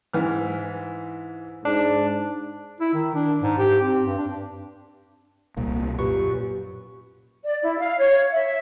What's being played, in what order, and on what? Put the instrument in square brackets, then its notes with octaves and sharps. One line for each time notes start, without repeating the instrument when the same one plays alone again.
[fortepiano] G#2 E3 F6
[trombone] G#2 [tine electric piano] D4
[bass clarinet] E4
D#3
D4
G#2
G4
C4
G2
D4
[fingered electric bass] D#1 C2 A#2 [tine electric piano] A#3
[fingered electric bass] F#2 [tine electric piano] A#2 B4 C#6 [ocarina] G4
[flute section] D5
E4
F5
C#5
E5